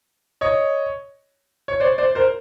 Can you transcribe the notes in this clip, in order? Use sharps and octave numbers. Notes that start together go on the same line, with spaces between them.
C#5 D#5
C#5
C5 D5
C5 D5
A#4 C5